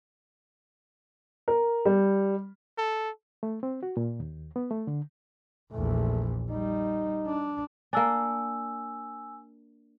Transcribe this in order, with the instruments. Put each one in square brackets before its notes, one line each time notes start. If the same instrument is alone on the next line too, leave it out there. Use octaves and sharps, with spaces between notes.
[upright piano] A#4
G3
[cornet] A4
[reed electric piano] A3
C4
F#4
A#2
D#2
B3
A3
D3
[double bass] A#1 E2 [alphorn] A3
[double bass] G3 [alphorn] D#4
[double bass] D4
[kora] A#3 D4 [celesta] G#5 E6